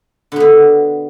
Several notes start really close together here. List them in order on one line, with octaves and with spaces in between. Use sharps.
D3 B2 B3